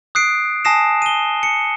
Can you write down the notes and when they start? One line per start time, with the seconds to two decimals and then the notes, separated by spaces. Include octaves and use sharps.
0.15 D#6 F#6 C7 D7
0.65 G#5 A5 D#6 A#6 C7 E7
1.02 D#7 G7
1.43 C#7